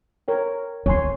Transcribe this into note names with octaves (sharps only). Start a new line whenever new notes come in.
A#4 C#5 G5
D2 C4 C#5 G#5 C6